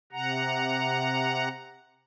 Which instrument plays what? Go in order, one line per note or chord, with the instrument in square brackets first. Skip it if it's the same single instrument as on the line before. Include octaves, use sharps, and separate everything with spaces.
[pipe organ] C3 F#5 A#5